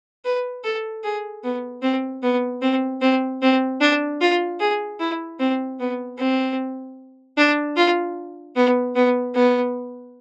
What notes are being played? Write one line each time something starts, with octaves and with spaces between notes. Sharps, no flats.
B4
A4
G#4
B3
C4
B3
C4
C4
C4
D4
F4
G#4
E4
C4
B3
C4
D4
F4
B3
B3
B3